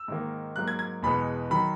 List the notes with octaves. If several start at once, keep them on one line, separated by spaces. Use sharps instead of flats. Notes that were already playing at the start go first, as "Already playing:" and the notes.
Already playing: E6
G#2 D#3 A#3
G#2 F#3 A#3 F#6
G#6
G#6
E2 B2 G#3 B3 B5
D#3 F#3 B5